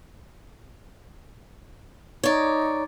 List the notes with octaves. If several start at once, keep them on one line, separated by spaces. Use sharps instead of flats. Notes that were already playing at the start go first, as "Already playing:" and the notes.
D#4 C#5 D5